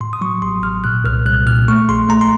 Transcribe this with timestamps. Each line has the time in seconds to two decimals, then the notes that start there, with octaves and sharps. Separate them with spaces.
0.01 A2 C6
0.13 D#6
0.21 F#3 C#6
0.42 A1 C6
0.63 A1 F6
0.84 A#2 F#6
1.04 C2 F6
1.26 C2 F#6
1.46 A#2 F6
1.68 A3 C#6
1.89 A#1 C6
2.09 A3 A#5
2.21 C6